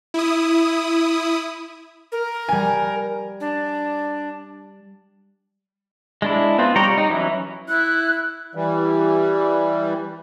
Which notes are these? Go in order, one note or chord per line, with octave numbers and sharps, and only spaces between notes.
E4 D#6
A#4
G3 G#5
D4
G#3 D4 E4
B3 C4 F4
G3 C#5 G5 A#5
D#4
E3 F#3 C#4 E4
E4 F#6
E3 G3